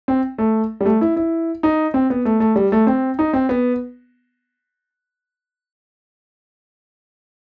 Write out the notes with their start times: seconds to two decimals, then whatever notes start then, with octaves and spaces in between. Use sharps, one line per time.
0.08 C4
0.38 A3
0.81 G3
0.85 A3
1.01 E4
1.16 E4
1.63 D#4
1.94 C4
2.10 B3
2.25 A3
2.40 A3
2.56 G3
2.72 A3
2.87 C4
3.19 D#4
3.33 C4
3.49 B3